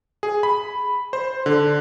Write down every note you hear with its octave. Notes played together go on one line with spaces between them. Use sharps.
G#4
B5
C5
D3